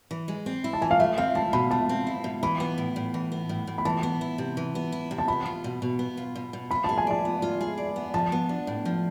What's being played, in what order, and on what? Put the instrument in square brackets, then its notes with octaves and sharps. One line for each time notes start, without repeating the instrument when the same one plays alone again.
[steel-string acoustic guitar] E3
G#3
C4
E4
[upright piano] A5
[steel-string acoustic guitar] E3 [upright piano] G#5
[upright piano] F5
[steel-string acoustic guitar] A3 [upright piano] E5
[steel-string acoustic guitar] C4 [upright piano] F5
[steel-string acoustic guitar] E4 [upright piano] A5
[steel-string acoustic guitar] B2 [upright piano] B5
[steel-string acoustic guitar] A3 [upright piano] A5
[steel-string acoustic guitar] C4
E4
B2
[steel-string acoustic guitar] E3 [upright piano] B5
[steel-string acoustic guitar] B3
A2
A2
E3
B3
A2
A2
[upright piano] B5
[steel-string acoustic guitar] E3 [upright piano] A5
[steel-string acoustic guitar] B3
E4
C3
E3
B3
E4
C3
[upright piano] A5
[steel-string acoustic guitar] B3 [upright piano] B5
[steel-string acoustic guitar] F4
B2
B2
B3
F4
B2
B2
[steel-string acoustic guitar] F4 [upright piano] B5
[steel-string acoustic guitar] G#4 [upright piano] A5
[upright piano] G#5
[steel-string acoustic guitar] D5 [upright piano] A5
[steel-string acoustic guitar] B3
F4
G#4
D5
B3
[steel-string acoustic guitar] F3 [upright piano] A5
[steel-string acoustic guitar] B3
D4
A2
F3